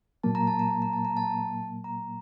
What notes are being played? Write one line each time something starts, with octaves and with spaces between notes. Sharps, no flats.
A#2 F#3 A#3 A5
A#5
A5
A#5
A5
A#5
A5
A#5
A5
A#5